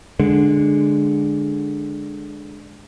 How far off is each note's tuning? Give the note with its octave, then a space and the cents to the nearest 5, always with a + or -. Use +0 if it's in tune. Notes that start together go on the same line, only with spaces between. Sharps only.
D3 +5 G#3 +0